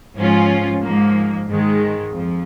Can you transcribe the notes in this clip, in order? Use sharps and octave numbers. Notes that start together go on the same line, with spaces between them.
G#2 F3 C#4 F4
G#2 F3 A#3
G#2 D#3 G#3
F2 F3